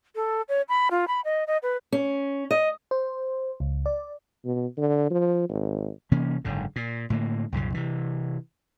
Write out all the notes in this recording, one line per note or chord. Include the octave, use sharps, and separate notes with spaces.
A4
C#5
B5
F4
B5
D#5
D#5
B4
C#4
D#5
C5
C#2
D5
B2
D3
F3
G#1
C3 E3 A#3 C#4
F#1 G#2 D3
A#2
A2 D3 A#3
C2 F#2 A#2 C#3
C3 E3